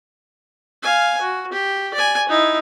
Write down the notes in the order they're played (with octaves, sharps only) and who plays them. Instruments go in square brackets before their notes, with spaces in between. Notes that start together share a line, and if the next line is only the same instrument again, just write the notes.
[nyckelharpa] F5 G#5
F#4
G4
D5 G#5
D#4 E4